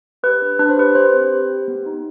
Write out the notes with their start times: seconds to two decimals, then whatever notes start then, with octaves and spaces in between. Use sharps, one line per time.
0.23 G4 B4
0.42 D4
0.59 D4 B4
0.70 C5
0.77 G4 B4
0.95 G4 C5
1.13 C4
1.32 G4
1.50 G4
1.68 B3
1.86 D#4